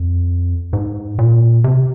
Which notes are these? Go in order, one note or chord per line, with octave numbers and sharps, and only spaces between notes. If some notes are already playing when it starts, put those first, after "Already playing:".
Already playing: F2
G#2
A#2
C3